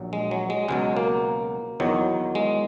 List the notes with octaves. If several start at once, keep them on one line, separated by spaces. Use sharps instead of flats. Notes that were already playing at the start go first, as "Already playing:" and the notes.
Already playing: A#1 A#2 F#3
G#3
F#3
G#3
C#2 B2 F#3 G#3
A#3
E2 D#3 F#3
G#3